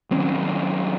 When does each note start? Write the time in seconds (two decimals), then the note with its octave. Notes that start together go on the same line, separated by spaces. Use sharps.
0.11 D#3 F#3 C4 C#4